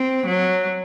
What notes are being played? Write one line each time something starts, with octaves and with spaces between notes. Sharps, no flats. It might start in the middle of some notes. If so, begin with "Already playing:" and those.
Already playing: C4
F#3